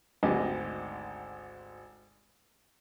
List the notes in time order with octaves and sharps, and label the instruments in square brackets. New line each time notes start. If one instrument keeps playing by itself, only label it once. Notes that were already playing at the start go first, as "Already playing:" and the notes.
[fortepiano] G#1 D2 G#2 G4 D#5